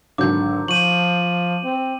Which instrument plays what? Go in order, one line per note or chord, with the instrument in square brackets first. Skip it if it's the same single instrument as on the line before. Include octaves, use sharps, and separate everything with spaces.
[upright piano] G#1 D3 F#3 [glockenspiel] D6 G6
[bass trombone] F3 [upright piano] C#6 G6 [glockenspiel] D#7 F#7
[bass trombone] C4